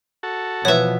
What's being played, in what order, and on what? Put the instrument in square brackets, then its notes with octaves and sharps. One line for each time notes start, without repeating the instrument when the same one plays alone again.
[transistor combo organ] F#4 A4
[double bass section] B2 E3 F3 [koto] B3 E5 [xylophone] B4 C#5